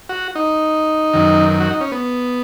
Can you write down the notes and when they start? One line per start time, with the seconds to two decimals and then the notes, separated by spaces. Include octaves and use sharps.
0.09 F#4
0.35 D#4
1.13 F#2 D#3
1.60 F#4
1.71 D#4
1.81 C#4
1.92 B3